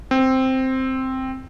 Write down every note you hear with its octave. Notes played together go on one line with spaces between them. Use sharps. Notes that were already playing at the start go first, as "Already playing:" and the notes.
C4